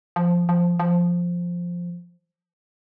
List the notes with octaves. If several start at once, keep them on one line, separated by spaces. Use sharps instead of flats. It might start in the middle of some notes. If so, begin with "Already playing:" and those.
F3
F3
F3